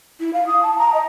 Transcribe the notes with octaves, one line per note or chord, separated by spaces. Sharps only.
E4
F5
D#6
A5
A#5
D#5